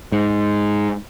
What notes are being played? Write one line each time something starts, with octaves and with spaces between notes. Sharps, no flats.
G#2